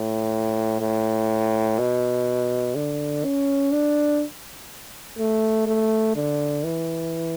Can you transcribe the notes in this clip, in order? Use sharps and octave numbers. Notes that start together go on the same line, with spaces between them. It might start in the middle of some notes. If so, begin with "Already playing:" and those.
Already playing: A2
A2
B2
D3
C#4
D4
A3
A3
D3
E3